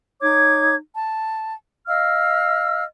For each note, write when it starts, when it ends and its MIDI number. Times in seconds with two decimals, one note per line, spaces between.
0.21 0.74 63
0.21 0.74 73
0.21 0.74 86
0.21 0.74 92
0.95 1.54 81
1.87 2.84 75
1.87 2.84 77
1.87 2.84 88
1.87 2.84 89